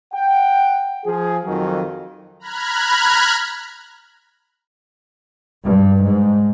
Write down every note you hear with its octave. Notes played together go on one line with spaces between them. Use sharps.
F#5 G5
F3 G#4
F2 D#3 F#3
A#5 B5 F6 F#6 G#6
G2
G#2